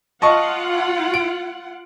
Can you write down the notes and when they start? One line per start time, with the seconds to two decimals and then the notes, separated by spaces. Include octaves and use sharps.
0.22 F4 D#5 F#5 A5 C#6
1.14 D7